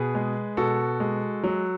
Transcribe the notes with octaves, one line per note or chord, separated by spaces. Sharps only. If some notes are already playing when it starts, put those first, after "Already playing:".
Already playing: B2 G#4 B4
G#3
B2 F#4 A4
G#3
F#3